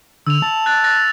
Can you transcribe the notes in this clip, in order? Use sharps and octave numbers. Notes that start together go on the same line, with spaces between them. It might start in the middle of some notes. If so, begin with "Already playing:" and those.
D3 E6 F7
A5
F#6 A6
F#6 A6 A#6